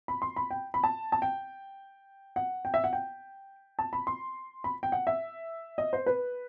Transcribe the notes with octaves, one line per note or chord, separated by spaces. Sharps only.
B5
C6
B5
G5
B5
A5
A5
G5
F#5
G5
E5
F#5
G5
A5
B5
C6
B5
G5
F#5
E5
D#5
C5
B4